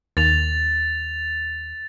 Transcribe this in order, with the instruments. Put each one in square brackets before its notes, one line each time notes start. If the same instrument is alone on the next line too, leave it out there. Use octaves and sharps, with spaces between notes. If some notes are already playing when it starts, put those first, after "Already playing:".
[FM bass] D#2 [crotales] A6 F7